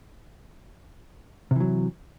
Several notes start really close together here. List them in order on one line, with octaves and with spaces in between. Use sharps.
C3 E3 F#3